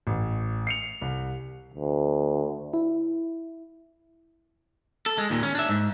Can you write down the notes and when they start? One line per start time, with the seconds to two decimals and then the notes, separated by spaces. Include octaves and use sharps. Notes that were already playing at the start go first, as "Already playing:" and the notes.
0.07 A1
0.67 C7 C#7 F7
1.02 C2
1.74 D2
2.73 E4
5.06 A4
5.18 G#3
5.30 D#2 A#2
5.43 C#4
5.55 D4 E5
5.69 G#2